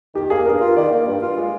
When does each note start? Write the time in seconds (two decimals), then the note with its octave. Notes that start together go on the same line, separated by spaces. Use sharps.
0.15 D#3 G4
0.30 A#3 G#4
0.45 G2 A#4
0.61 F4
0.77 D#3 D5
0.91 A#3
1.07 G2
1.22 F4
1.37 G#3